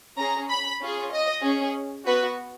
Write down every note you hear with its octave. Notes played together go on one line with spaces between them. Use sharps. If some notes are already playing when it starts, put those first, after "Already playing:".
C#4 G#4 A#5
B5
C#4 F4 G#4
D#5
C#4 G#4
B3 F#4 B4